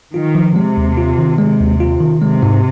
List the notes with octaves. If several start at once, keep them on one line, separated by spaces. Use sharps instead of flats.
D#3 F4
F3
C3 G#3
D#2
F4
D#3
C3 G#3
D#2
F4
D#3
C3 G#3
G#2